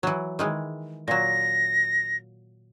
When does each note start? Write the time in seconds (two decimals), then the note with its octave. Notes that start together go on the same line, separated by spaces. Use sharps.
0.03 E3 F#3
0.39 D#3 E3 G#3
1.08 A#2 F#3 A#6